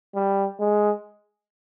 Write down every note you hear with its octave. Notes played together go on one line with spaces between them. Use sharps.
G3
G#3